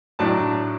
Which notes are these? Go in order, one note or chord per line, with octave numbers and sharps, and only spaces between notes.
A2 F#3 D4 A5